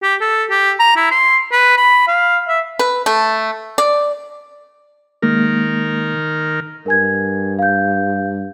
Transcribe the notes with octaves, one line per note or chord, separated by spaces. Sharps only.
G4
A4
G4
A#5
E4
C6
B4
B5
F5
E5
B4
A3
D5
D#3 G#3 A#3 A#4
G2 A#4 G#5 G#6
F5 G6